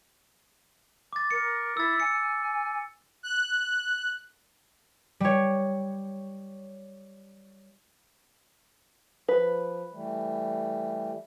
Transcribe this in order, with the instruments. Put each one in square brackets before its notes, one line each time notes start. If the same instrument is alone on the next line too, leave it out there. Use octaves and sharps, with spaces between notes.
[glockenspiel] D6 A6
[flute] A#4 [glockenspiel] C#7
[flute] E4 [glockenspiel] E6 A6
[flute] G#5 [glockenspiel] C#7
[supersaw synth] F#6
[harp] G3 C#5
[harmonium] F3 [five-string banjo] B4
[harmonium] E3 G3 A3